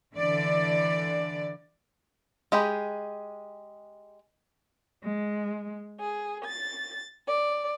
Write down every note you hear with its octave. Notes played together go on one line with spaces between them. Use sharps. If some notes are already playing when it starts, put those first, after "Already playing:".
D3 E3 D5
G#3 G4 G#4 B5
G#3
G#4
A6
D5